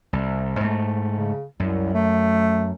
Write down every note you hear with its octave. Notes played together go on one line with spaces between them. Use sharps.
C2
G#2 A3
C#3
C2 F#2
A3